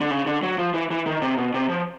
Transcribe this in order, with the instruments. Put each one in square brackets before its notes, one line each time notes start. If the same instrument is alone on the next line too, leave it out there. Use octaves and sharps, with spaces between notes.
[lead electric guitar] D3
C#3
D3
F#3
F3
E3
E3
D#3
C3
B2
C3
F3